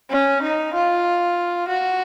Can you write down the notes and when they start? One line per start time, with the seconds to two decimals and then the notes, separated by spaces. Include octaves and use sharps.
0.11 C#4
0.42 D#4
0.74 F4
1.68 F#4